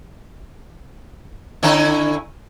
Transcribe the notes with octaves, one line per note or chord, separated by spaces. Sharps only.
D3 C#4 E4